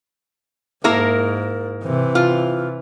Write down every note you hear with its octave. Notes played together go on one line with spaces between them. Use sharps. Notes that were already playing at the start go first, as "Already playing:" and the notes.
G#2 A#3 E4 A#4
C3 E3
F4